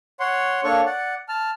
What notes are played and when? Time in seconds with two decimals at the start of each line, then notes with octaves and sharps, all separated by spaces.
0.20 C#5 F#5 C6
0.64 A#3 D4 A4 C#5 C#6
0.86 D5 F#5
1.29 A5 F6